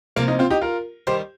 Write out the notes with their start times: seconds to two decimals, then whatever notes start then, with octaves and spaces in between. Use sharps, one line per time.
0.16 C3 F3 A#3
0.28 A#3 D#4
0.39 C4 F4
0.50 D#4 G4
0.61 F4 A#4
1.07 D#3 G3 G4 C5